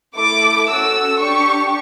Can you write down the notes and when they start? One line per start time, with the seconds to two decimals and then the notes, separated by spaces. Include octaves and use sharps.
0.17 A3 E4 A4 D6
0.69 C#4 F#4 A4 E6
1.21 D4 G4 C#6